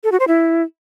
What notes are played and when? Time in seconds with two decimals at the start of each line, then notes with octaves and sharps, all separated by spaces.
0.04 A4
0.12 F#4
0.20 C5
0.28 E4